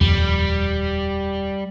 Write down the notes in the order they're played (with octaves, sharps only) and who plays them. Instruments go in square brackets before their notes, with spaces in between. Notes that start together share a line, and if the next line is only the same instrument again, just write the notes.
[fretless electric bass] D#1 F2 [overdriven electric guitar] G3